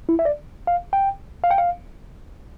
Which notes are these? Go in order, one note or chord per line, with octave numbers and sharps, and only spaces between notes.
E4
E5
D5
F5
G5
F5
G5
F5